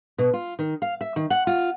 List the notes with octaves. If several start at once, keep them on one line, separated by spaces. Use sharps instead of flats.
B2
F4
D#3
F5
E5
D#3
F#5
F4